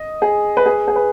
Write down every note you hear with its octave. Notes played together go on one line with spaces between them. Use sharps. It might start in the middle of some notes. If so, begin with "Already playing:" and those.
Already playing: D#5
G#4
B4
G#4
G#4
B4